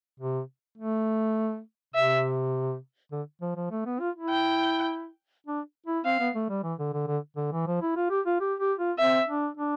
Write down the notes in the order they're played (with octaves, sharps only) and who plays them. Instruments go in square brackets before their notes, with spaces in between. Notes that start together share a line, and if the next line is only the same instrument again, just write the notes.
[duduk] C3
A3
[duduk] C3 [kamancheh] E5
[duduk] D3
F3
F3
A3
B3
F4
E4
[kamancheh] G5
[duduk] D4
E4
[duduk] C4 [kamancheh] F5
[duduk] B3
A3
G3
E3
D3
D3
D3
D3
E3
F3
E4
F4
G4
F4
G4
G4
F4
[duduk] C4 [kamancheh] E5
[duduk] D4
D4